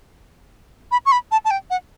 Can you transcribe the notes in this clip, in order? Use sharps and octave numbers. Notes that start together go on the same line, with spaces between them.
B5
C#6
B5
A5
A5
G5
F#5